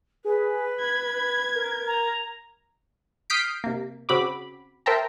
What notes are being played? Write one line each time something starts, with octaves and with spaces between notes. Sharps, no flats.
G#4 B4
B5 G#6
A#4
A#5
D#6 F6 G6 B6 C7 D7
C3 A#3
C#3 C4 F#4 B5 D6
A#4 C5 E5 G5 A5 A#5